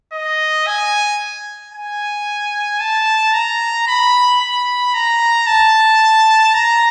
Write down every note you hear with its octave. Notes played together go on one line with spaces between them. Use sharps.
D#5
G#5
G#5
A5
A#5
B5
B5
A#5
A5
A#5